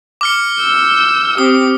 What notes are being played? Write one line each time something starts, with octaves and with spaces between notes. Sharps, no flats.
D6 F6 C#7
E6 G6
C4 G4 D#6